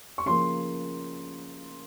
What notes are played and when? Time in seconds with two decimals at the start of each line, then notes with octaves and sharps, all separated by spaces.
0.18 C#6
0.26 C#3 F3 A#3 C6